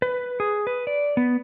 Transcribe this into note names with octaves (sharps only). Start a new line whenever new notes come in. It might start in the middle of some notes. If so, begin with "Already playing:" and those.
B4
G#4
B4
D5
B3